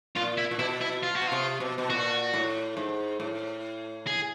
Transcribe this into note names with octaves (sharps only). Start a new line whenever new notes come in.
A#2 F4
E4
A#2
B2 E4
E4
F4
F#4
B2
C3 F4
B2
B2
A#2 F#4
A2
G#2
A2
G#4